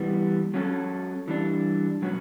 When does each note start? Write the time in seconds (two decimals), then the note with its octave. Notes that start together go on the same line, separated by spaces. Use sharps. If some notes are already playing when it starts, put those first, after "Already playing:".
Already playing: E3 G3 B3
0.54 F#3 C#4 F#4 A4
1.28 E3 G3 D4
2.02 B2 F#3 C#4 F#4